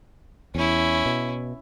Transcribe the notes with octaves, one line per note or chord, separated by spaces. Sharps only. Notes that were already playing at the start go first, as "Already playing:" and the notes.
E2 C#4 E4
B2